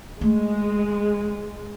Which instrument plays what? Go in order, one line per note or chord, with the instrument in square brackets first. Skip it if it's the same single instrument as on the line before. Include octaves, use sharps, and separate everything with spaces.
[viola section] G#3 [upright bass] A3